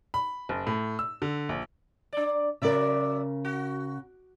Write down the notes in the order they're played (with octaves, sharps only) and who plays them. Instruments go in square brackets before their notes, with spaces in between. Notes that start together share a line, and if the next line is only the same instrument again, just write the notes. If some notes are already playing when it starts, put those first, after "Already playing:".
[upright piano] B5
F#1
A2
E6
D3
A#1
[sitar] D4 D5
[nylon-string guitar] C#3 A#4 [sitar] F#3 D5 E5
[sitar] F#4